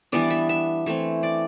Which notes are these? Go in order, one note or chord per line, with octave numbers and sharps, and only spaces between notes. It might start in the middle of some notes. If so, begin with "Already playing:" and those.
E3 G3 B3 D4 D5
E5
E5
E3 A3 C4
D5